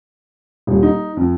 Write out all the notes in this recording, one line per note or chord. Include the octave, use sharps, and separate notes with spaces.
D#1
D#4
F2